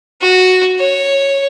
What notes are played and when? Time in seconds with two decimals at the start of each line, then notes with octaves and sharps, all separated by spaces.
0.22 F#4
0.80 C#5